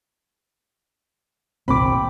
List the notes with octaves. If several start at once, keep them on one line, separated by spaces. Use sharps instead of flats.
G1 C2 A#2 D#3 C4 B5 D6